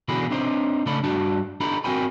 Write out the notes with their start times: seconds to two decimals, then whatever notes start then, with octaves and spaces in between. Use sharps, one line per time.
0.08 B2 D3 E3 F#4 G#4 B5
0.30 C4 D4 D#4 C5
0.86 C#3 A3 A4 D5 B5
1.04 G2 D4 F#4 A5
1.60 D4 D#4 G4 A4 A#5 B5
1.84 C4 F#4 A#4 G5 G#5 B5